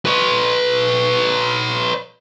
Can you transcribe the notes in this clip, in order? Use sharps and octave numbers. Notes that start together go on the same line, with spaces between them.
B4 C#5